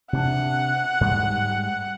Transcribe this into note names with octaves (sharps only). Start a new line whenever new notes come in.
C3 C#4 D4 F#5
G#2 G3 G#3